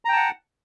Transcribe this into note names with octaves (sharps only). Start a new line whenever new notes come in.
F#5 G5 A5 A#5